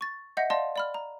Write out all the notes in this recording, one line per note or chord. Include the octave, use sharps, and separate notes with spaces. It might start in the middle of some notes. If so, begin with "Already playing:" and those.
C#6 A6
D#5 E5 F#5 G6 A#6 C#7
D5 D#5 F5 A5 C6
D5 B5 F6
A#5